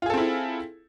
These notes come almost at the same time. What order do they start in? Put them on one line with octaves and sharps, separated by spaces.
F4 G#4 A4 C4 E4